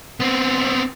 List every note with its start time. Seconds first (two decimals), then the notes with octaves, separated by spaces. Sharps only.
0.20 B3 C4